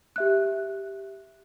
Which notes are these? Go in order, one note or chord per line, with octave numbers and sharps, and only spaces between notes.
G4 E5 F#6